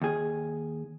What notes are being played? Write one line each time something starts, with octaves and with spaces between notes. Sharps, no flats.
D#2 G#4